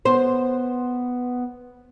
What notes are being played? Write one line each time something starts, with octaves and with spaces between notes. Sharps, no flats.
B3 C5